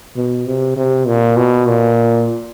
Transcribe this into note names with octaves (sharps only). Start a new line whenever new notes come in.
B2
C3
C3
A#2
B2
A#2